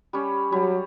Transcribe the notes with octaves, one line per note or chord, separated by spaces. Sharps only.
G3 C#4
F#3 G3